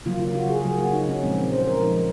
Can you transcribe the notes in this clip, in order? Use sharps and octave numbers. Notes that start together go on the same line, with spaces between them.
C#3 F#3 A#3 F4
F4
F#4
G#4
C#3 F#3 A#3 G#4
F#4
D#4
C#4
A#2 F3 G#3 C4
C#4
C5
A#4
A#2 F3 G#3 D#4